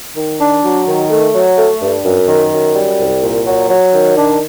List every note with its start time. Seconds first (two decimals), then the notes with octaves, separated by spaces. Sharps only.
0.17 D#3
0.40 D4
0.65 F#3
0.88 D#3
1.11 A3
1.34 F#3
1.57 A3
1.82 G2
2.04 F#2
2.28 D#3
2.53 F#2
2.75 G3
2.99 C2
3.23 A#2
3.46 F#3
3.69 F#3
3.93 D#3
4.17 D4